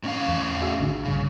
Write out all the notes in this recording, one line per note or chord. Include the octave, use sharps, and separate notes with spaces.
A2 C#4 F5
E2
F#4 G#4 E5
A1 D3
A#1 G2 C#3